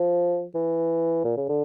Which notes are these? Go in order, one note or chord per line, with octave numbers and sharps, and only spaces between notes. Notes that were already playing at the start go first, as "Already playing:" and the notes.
Already playing: F3
E3
A#2
C#3
D3